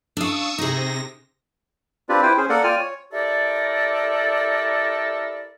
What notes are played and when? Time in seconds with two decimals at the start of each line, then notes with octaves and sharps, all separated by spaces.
0.17 D4 F5 C#6 D#6 E6
0.58 C3 D#4 G#4 A#6
2.09 C4 D4 F4 G4 B4 D5
2.22 E4 B4 C5 G5
2.37 C#4 G#4 C5
2.49 A#3 A4 A#4 D5 F#5
2.64 F4 D5 G5 G#5 F6
2.78 C#5
3.13 E4 G4 A4 A#4 D5